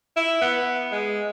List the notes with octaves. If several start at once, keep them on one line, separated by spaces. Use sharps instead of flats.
E4
B3
G#3